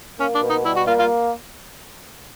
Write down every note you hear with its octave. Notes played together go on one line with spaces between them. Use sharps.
A#3 C#4
D4
B2
D#4
G3 E4
F#4
A#3 F4
F4